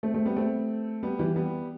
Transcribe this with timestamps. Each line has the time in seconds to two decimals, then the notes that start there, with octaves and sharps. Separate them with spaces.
0.03 A3 C4
0.14 A3 C4
0.26 G3 B3
0.36 A3 C4
1.03 G3 B3
1.19 E3 G3
1.36 G3 B3